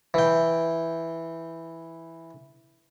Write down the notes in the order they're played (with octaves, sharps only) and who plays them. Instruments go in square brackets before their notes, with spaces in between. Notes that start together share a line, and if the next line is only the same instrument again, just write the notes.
[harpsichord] E3 G5